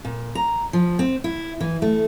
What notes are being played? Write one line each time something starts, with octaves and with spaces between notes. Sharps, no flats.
A#2
A#5
F3
C4
E4
E3
A3